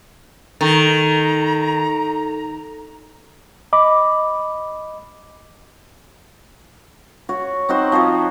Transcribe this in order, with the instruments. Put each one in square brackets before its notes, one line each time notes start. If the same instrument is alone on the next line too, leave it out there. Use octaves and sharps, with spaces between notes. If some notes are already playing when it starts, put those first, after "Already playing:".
[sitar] D#3 [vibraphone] A4 [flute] A#5
[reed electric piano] D#5 B5 D6
[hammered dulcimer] F#4 C#5
C4 D#4 F#4 C5
F3 C4 F#4 C#5